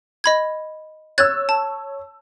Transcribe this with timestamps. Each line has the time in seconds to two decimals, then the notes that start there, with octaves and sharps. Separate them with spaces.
0.24 D#5 B5 G#6
1.18 C#5 E6 F#6 G#6 A6
1.49 A5